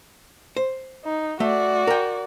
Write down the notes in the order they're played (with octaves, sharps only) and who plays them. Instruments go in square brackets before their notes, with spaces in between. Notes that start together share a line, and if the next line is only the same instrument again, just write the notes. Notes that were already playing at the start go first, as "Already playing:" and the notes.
[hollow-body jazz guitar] C5
[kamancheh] D#4
[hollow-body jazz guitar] A3 [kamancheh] F#4 D5
[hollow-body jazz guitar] A#4 G5